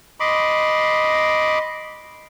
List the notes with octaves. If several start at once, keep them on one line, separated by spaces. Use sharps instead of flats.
D#5 B5 C6 D6